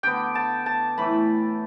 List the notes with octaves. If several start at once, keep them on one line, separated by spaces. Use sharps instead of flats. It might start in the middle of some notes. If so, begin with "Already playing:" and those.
D3 B3 G5
A5
A5
A2 E3 A3 B5